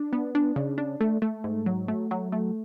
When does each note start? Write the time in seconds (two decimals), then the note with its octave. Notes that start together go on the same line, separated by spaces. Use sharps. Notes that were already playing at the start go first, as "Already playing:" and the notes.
Already playing: D4
0.13 B3
0.35 D4
0.56 C#3
0.78 D4
1.01 A3
1.22 A3
1.44 G#2
1.66 F#3
1.88 A3
2.11 F#3
2.32 A3